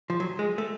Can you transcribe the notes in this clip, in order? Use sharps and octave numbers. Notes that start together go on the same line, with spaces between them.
F3
F#3
G#3
A3